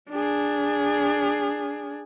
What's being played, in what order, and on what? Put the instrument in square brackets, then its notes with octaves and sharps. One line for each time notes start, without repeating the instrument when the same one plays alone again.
[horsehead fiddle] D4 G#4